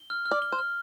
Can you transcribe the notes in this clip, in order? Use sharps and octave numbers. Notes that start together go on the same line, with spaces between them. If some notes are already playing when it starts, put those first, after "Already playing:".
Already playing: G7
F6
F6
D5
G7
C5
F6